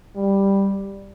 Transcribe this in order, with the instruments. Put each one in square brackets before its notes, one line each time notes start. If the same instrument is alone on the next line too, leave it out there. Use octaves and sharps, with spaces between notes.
[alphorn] G3